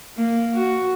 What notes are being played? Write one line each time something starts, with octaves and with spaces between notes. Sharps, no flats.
A#3
F#4